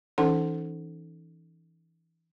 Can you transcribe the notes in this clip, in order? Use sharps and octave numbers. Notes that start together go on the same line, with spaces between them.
E3 C#4 D#4 A4 F#5 C6